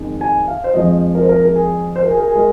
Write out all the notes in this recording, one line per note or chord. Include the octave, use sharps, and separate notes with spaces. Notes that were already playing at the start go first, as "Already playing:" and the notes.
Already playing: F2 D#3 G#3
G#5
F5
C5
F2 F3 G#3 D#5
A#4
C5
A#4
A#4
G#4
C5
A#4
G#4
A#4
G#4
G#3 A#4